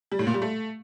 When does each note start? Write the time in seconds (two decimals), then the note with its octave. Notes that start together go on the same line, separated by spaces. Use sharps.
0.12 G3
0.19 A2
0.27 A#2
0.34 G3
0.42 A3